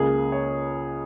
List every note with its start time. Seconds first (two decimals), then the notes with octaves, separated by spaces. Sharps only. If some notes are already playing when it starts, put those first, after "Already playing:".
Already playing: C#2 C#3 A#3 G#4
0.32 C#5